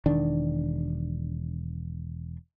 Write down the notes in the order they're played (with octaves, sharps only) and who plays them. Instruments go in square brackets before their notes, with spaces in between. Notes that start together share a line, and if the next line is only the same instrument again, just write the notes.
[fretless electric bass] E1 D#3 D4